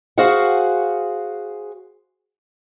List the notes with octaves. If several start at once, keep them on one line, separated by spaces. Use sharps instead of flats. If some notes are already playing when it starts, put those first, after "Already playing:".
F#4 G#4 C5 F5 F#5